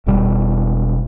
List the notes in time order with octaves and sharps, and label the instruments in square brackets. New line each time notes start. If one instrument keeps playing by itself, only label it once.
[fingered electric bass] E1 E2 B2 G3